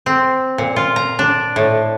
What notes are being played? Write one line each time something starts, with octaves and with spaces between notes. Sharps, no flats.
C4
A#2
F4
A#5
D4
A2